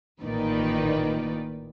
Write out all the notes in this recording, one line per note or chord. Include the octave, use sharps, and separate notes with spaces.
A1 A#2 D#3 D#4 B4 D5